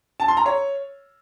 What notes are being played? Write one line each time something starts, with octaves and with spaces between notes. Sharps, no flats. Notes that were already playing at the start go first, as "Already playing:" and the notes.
A5
C6
A#5
C#5